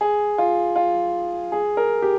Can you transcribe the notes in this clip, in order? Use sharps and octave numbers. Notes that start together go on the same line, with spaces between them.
G#4
F4
F4
G#4
A#4
G4